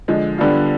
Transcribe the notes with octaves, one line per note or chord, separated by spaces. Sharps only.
D3 F3 G#3
D3 G3 B3 D4 F4